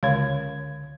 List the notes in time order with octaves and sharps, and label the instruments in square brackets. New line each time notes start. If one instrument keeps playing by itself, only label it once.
[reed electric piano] C#2 G#6 [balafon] D3 C#5 F5